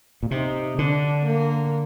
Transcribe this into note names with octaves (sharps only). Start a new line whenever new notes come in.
A#2
C3 D#4
D3 D4
A#3